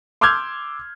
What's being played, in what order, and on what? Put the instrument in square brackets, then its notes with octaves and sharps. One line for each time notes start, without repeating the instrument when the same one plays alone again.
[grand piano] C6 D6 E6 F6 G6 G#6